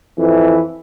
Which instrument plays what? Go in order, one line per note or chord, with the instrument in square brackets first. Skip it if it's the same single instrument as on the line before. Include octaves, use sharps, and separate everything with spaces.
[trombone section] F2 E3